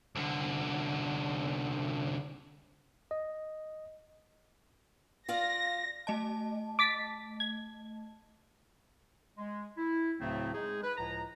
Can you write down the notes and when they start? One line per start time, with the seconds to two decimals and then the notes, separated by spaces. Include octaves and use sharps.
0.15 C2 D3
3.11 D#5
5.29 F4 D5 F5 A#6
6.07 A3 D#5 A5
6.79 D6 A6 B6
7.40 G#6
9.37 G#3
9.78 E4
10.20 D2 A2 C#3 F#3 A3 C4
10.55 G#3 D#4 G#4
10.83 B4
10.97 C#2 A2 F3 A#5